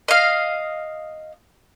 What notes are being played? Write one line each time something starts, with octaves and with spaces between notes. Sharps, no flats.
D#5 F5